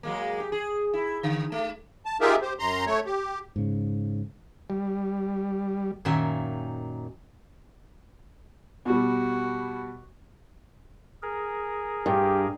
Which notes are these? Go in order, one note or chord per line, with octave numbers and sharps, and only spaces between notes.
F#3 G#3 A#3
G4
G#4
E4
D3
A3
A5
D#4 F4 G4 G#4 A#4 E5
G4 C5
F#2 A#5 C6
A3 C#5
G4
G#2 C#3
G3
F#2 A#2 D#3 E5 G#5
B2 G3 F#4
G#4 A#4
G2 G4